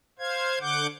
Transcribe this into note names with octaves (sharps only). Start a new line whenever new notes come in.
C5 F5 G#6
D3 F#5 D6 G6